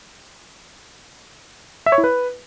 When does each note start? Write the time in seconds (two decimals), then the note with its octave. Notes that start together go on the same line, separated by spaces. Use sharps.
1.86 E5
1.92 C#5
1.98 E4
2.04 B4